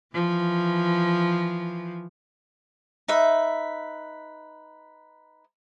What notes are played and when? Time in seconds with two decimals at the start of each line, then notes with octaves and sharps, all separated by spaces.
0.14 E3 F3
3.08 D#4 B4 E5